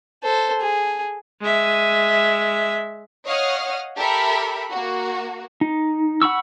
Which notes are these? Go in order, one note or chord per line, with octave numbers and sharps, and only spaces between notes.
A4 C5
G#4
G#3 E5
C#5 D#5 F5 F#5 D#6 F6
G4 A4 A#4 E5 B5
A#3 F#4
D#4
F#5 B5 C#6 E6